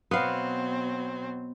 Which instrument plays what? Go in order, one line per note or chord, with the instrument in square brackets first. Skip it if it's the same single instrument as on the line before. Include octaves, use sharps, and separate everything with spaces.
[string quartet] B2 F#3 C4 [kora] B3 F5